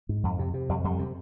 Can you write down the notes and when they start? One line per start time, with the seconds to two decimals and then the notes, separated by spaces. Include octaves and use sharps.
0.09 G#2
0.24 F2
0.39 C3
0.54 C3
0.69 F2 G3
0.84 F2 G3
0.99 C3